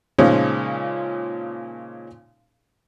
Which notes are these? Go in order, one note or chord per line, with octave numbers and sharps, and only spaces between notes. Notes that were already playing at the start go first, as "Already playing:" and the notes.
A#2 C#3 F3 G#3 C#4 D#4